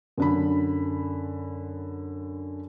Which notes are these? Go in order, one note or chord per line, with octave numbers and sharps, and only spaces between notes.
F#2 D3 B5